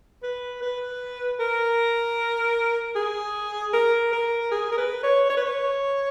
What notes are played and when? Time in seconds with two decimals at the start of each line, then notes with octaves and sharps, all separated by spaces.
0.23 B4
0.62 B4
1.40 A#4
2.96 G#4
3.73 A#4
4.13 A#4
4.51 G#4
4.72 A#4
4.78 B4
5.03 C#5
5.29 C#5
5.37 B4
5.45 C#5